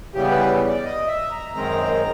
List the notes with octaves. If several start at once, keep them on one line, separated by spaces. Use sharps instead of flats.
C#3 E3 G3 B3 G4
B4
D5
D#5
E5
A#5
F#2 D#3 G#3 C4 A#5